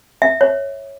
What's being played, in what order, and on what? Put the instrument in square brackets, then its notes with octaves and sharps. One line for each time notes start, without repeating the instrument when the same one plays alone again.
[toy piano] E5
C#5